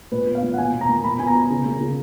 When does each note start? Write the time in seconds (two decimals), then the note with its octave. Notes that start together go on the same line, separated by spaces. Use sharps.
0.12 A#2 B4
0.27 B3
0.35 F5
0.43 A#2
0.54 F#5
0.58 B2 G#5
0.74 B2
0.81 A#5
0.89 A#3
1.04 B2 B5
1.19 B3 G#5
1.27 A#5
1.35 B2
1.50 C#3
1.65 A#3
1.80 C#3